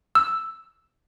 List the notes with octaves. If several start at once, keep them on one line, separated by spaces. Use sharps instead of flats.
E6